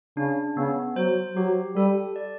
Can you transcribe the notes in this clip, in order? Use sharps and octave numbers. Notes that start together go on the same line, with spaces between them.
C#3 D4
C#3 B3
F#3 C5
F#3 G4
G3 A4
D5